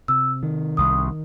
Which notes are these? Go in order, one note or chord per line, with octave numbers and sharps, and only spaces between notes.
C3 E6
D#3
C2 D#6